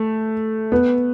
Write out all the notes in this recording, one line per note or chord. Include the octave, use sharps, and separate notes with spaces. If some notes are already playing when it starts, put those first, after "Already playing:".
Already playing: A3
B3